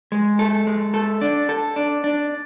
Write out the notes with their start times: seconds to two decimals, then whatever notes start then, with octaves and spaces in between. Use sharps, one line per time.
0.12 G#3
0.39 A4
0.67 G#3
0.94 A4
1.21 D4
1.49 A4
1.76 D4
2.04 D4